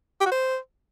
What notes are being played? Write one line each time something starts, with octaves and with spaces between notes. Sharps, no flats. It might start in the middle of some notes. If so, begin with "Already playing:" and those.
G4
F#4
C5